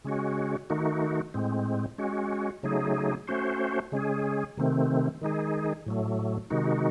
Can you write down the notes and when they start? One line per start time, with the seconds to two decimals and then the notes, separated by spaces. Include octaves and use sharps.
0.04 C#3 G#3 C#4 F#4
0.70 D#3 A3 D#4 F#4
1.34 A2 G#3 C4
1.98 G#3 C#4 F#4
2.63 C#3 F#3 A3 D#4 G#4
3.28 A3 C#4 F#4 C5
3.92 C#3 G#3 C#4 G#4
4.57 C3 D#3 A3 C4
5.21 D#3 G#3 D#4 G#4
5.86 A2 F#3 A3
6.50 C3 D#3 G#3 D#4 F#4